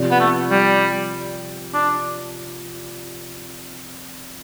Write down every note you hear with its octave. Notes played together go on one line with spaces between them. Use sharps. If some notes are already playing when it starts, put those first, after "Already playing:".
Already playing: C3 F3 C4 G4 D5
B3
A3
G3
D4